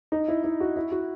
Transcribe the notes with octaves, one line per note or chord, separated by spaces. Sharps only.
D#4
E4
E4
F#4
E4
F#4